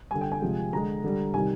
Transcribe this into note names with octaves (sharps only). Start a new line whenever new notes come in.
D3 G3 G#5
G5
G#5
C3 F3 G#3
D3 G#3 A#5
D3 G3
C3 D#3 G3 G#5